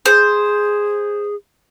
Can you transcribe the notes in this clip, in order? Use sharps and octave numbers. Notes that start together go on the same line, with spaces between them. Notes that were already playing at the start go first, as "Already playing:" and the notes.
G#4 C5